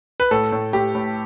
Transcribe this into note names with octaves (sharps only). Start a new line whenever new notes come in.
B4
A2 A4
A2
A2 G4
A2